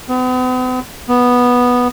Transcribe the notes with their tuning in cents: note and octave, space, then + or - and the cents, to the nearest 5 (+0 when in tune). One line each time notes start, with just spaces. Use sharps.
B3 +45
B3 -5